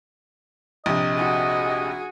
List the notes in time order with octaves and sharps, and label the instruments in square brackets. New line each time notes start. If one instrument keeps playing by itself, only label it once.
[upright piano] A#1 C3 [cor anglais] D#5
[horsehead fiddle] F#4 G#4